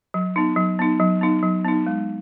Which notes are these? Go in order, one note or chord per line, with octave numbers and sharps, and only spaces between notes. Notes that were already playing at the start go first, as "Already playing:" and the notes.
F#3
B3 D#4
F#3
B3 D#4
F#3
B3 D#4
F#3
B3 D#4
G#3